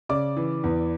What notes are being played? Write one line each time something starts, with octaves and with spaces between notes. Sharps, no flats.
C#3 D5 D6
E3
E2